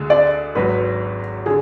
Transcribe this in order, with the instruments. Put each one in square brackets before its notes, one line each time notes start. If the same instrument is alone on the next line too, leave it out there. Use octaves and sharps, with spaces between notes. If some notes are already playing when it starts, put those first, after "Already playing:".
Already playing: [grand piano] D2 D3 G#3
[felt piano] D5
[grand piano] G#1 G#2 F#3 [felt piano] B4
[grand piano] D3 [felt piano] G#4